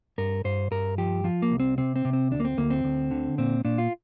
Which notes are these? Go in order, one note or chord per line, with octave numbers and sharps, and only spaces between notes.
G2 A#4
G2 C5
G2 A#4
F3 G4
F3 F4
A#3
C2
C4
C3 C4
C4
C3
C4
D2 D4
A#3
C4
D2 A#3
C4
D2
D3
A#2 C4
A#2 D4
F4